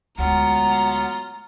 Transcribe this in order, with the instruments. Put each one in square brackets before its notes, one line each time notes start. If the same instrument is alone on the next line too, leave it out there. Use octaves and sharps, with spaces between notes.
[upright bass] D2 G#3 [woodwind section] F#3 B3 F4 [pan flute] F#5 [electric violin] A#5